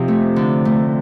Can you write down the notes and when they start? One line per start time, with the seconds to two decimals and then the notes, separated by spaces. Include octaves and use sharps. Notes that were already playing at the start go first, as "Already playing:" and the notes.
Already playing: C3 F3 C4 D#4
0.08 A3
0.36 D3
0.65 A3